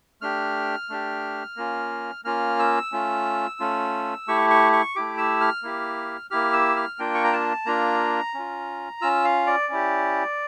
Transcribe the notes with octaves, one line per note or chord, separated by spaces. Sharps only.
A3 D4 G4 F6
A3 D4 G4
A#3 C#4 F4
A#3 C#4 F4 F6
E6
A3 C#4 F4
A3 C#4 F4
A3 E4 G4 C#6
C#6
C#6
A3 E4 G4 D6
E6
F6
A#3 E4 G4
A#3 E4 G4 F6
E6
F6
A#3 D4 F4 G5
C#6
A#5
A5
A#3 D4 F4 A#5
C#4 F4
C#4 F4 E6
F5
D5
C#4 E4 G4